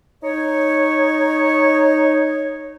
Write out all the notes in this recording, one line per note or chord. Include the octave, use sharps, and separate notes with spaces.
D#4 C#5